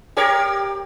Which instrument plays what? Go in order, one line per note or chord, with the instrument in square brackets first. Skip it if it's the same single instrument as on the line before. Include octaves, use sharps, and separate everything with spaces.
[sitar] G4 A#4 C#5